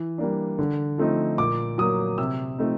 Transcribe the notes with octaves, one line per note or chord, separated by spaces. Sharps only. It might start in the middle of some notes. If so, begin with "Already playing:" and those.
Already playing: E3
G3 A#3 D4
D3
F3 A3 C4 D#4
A#2 D6
F#3 A#3 D#6
C3 E6
F3 A3 C4 D#4